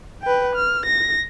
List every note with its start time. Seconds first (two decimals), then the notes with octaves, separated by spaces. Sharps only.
0.22 B4 G5
0.56 F6
0.86 A#6